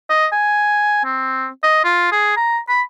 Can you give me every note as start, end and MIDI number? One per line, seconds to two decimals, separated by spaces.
0.09 0.26 75
0.32 1.00 80
1.04 1.47 60
1.63 1.81 75
1.84 2.07 65
2.12 2.36 68
2.37 2.59 82
2.69 2.81 83